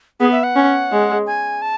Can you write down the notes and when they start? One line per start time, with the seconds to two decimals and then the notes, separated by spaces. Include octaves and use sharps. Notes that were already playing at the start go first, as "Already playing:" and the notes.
0.20 B3 G#4
0.32 E5
0.44 F#5
0.56 C#4
0.92 G#3
1.27 G#5
1.62 A5